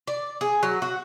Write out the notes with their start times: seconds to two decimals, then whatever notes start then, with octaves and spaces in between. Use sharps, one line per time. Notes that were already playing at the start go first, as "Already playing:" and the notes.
0.07 D5
0.41 G#4
0.63 F#3
0.82 F#4